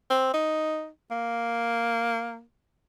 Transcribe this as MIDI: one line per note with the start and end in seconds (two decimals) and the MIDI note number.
0.10 0.33 60
0.34 0.88 63
1.11 2.42 58